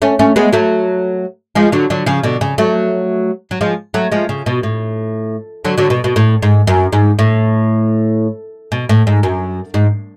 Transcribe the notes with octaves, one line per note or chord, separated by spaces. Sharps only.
A3 C#4
A3 C#4
G#3 B3
F#3 A3
F3 G#3
D3 F#3
D3 F#3
C#3 F3
B2 D3
C#3
F#3 A3
F#3
F3 G#3
F#3 A3
F3 G#3
C#3
B2
A2
D3 F#3
D3 F#3
B2
B2
A2
G#2
F#2
G#2
A2
B2
A2
G#2
F#2
G#2